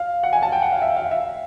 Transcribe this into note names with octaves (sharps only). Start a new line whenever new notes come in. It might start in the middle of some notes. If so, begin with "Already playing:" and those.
Already playing: F5
F#5
G#5
A5
G5
F#5
F5
E5
F5
E5